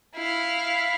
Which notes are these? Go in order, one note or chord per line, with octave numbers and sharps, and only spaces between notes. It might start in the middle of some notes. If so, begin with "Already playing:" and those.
E4 F5